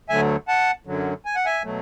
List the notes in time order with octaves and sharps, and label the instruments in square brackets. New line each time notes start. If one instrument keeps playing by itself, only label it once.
[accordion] D2 D3 F#3 A3 E5 G#5
F#5 A5
F#2 D3 F#3
G#5
F#5
E5 G#5
B2 F#3 A3